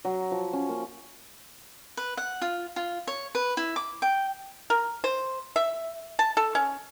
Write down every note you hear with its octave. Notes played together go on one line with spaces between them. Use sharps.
F#3
F3
C#4
A#3
B4
F#5
F4
F4
C#5
B4
E4
D6
G5
A#4
C5
E5
A5
A4
C#4